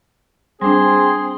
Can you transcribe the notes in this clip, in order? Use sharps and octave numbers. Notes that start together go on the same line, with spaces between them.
G3 C4 D4 G#4 C6